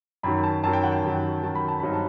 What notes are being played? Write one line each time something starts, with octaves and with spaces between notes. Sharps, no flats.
F#2 D#3 F#3 B5
A5
F#2 D#3 F#3 A5
G5
F#5
G5
F#2 D#3 F#3
F#2 D#3 F#3 A5
B5
A5
G2 F#3 C4 D#4 B5
A5